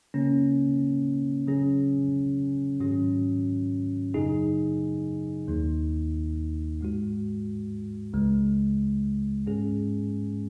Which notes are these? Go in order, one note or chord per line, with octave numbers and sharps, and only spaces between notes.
C#3 A#3 C#4
C#3 F#3 C#4 G#4
G#2 D#3 F#3 C#4 F#4
F#2 C#3 F#3 D#4 G#4
D#2 D#3 A#3 D#4
G#2 G#3 F#4
C#2 C#3 G#3
G#2 G#3 C#4 G#4